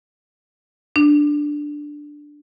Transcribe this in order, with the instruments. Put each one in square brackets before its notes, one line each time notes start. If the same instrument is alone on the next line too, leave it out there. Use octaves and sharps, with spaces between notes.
[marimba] D4